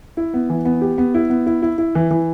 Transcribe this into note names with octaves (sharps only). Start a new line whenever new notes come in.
E4
B3
E3
B3
G4
B3
E4
B3
E4
E4
E4
E3
E3